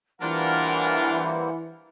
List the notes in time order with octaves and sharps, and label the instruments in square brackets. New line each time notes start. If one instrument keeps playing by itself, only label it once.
[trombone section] E3 [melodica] G3 A#3 C5 [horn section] D4 F4 A#4 [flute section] F#5